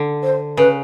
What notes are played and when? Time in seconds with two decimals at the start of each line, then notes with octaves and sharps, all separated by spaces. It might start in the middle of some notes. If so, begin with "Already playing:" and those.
Already playing: D3
0.22 C5
0.57 C#3 B4